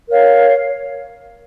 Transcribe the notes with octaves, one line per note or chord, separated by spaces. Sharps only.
A#4 C#5 F5